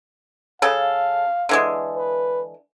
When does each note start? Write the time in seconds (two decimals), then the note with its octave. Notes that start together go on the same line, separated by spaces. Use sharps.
0.62 C#3 A4 F5
1.49 D3 E3 G#3
1.97 B4